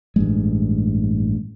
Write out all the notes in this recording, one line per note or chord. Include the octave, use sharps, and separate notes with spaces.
A1 G2 G#3